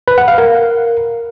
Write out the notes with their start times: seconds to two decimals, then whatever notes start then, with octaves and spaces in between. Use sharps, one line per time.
0.08 B4
0.18 F#5
0.28 F5
0.38 A#4